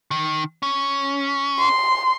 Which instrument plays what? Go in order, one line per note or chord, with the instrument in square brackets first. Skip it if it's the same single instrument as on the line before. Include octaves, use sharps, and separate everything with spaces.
[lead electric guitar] D#3
C#4
[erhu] C6